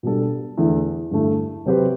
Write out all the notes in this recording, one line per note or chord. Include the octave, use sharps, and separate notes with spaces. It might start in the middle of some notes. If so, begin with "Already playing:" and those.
B2 G3 D4 A4
E2 D3 A3 E4
G2 D3 A3 E4
C3 F#3 C4 G4 B4